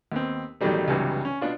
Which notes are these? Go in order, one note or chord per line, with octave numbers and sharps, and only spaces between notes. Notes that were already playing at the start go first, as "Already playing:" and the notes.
D#2 B3 C4
A1 B2 D#3 F#3 G3 A3
C#2 G2 C3 E3 F#3
C#4
B2 B3 D4 F4